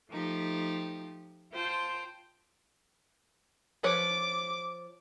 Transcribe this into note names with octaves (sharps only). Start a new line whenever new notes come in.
F3 A3 D#4 G4
F4 C5 G5 A5
F3 B4 C#5 D6